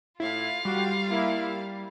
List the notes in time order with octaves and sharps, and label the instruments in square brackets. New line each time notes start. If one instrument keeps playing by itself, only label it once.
[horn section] A2 [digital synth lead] E4 [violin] F4 F5
[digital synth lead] G3 [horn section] F#4 G4
[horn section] A#3 E4